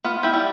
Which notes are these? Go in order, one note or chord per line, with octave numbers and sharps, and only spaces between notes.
B3 F4
E4 G4
G3